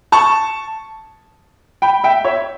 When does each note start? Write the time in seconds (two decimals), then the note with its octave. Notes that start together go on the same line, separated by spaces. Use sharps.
0.12 A5 C#6
1.82 G5 B5
2.04 E5 G5
2.25 C#5 E5